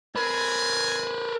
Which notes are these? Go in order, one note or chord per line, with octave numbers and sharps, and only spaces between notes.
C4 A#4 B4 G#5